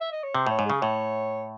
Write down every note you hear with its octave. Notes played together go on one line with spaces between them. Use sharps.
E5
D#5
C#5
C3 C5
A2 C#5
G#2
C#3 G#4
A2 C#5